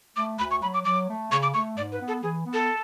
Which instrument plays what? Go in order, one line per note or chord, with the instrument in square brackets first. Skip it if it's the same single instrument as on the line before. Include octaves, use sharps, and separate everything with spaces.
[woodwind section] A3 [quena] D6
[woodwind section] D2 [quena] B5
[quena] C#6
[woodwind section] F#3 [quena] B5
[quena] D6
[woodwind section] F#3 [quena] D6
[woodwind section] A3
[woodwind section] C#3 [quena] C#6
[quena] D6
[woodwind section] A3 [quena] C#6
[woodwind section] G#2 [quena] D5
[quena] B4
[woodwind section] B3
[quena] A4
[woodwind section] E3 [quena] G#4
[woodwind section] B3
[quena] A4